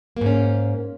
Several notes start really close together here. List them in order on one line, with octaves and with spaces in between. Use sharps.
A#3 G#2 C#4